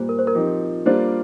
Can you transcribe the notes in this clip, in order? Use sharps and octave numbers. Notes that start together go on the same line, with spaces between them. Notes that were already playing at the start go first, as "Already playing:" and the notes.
Already playing: A#2 G3 A#3 C5
A#4
C5
A#4
F3 C4 D#4 G4
G3 A#3 D4 F4 C5